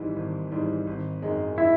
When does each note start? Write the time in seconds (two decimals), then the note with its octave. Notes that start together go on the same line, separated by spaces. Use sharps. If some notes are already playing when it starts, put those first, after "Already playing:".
Already playing: G#1 G#2 E3 G3
0.16 G#1
0.51 G#2 E3 G3
0.87 G#1
1.22 F#2 D#3 G#3
1.58 E4